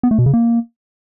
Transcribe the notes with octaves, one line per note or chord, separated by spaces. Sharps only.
B3
A3
B2
C#3
A#3